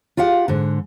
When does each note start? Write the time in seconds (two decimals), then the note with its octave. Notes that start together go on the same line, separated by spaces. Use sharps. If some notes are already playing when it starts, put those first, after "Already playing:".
0.17 F4 G4 F5 F#5
0.48 G#2 D3